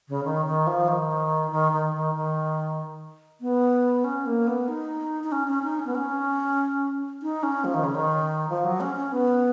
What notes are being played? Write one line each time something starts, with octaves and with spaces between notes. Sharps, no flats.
C#3
D#3
D#3
F3
D#3
D#3
D#3
D#3
D#3
B3
C#4
A#3
B3
D#4
D#4
C#4
C#4
D#4
C#4
B3
C#4
D#4
C#4
F3
D#3
C#3
D#3
F3
F#3
C#4
C#4
B3